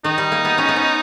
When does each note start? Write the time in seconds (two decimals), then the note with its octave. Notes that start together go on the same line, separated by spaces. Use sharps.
0.04 D#3 D#4
0.18 G3
0.32 A#3
0.45 B3
0.58 C#4
0.68 B3
0.76 C#4